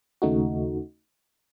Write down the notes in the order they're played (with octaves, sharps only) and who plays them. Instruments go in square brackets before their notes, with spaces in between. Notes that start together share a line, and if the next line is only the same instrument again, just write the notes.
[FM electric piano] D#2 C#3 A3 D#4 F#4